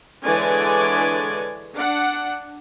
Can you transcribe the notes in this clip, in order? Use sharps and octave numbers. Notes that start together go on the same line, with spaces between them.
D3 E3 G#3 C#5 D5 G#5
D4 F#5